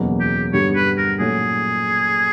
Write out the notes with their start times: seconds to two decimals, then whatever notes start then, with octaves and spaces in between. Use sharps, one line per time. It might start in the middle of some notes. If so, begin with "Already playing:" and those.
Already playing: F#1 E2 B2 F#3 A#3
0.20 G4
0.53 G2 D3 G3 B3 C#5
0.75 B4
0.97 A#4
1.19 A#2 F#3 A3 C#4 G#4